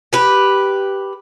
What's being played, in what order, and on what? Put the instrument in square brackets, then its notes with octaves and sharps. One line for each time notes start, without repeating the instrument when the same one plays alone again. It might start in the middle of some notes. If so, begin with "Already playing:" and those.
[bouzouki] G4 B4